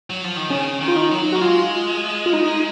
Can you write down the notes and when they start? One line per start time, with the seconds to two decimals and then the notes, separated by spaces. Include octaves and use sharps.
0.10 F#3
0.24 F3
0.37 D#3
0.50 C#3 C#4
0.81 D#3
0.88 F4
0.96 D#4
1.11 F#3
1.32 A#3 F#4
1.41 G#3 F4
2.26 F4
2.33 D#4